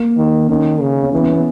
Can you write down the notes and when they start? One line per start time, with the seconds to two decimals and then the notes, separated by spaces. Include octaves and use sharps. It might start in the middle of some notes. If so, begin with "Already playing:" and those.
Already playing: A#3
0.17 D#3
0.49 D#3 C#4
0.81 C#3
1.03 C#4
1.13 E3 B3
1.23 C#4
1.34 B3